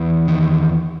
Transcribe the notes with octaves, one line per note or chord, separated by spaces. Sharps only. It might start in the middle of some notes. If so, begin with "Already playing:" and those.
Already playing: E2
D#3